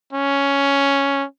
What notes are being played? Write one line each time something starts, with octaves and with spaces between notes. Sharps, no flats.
C#4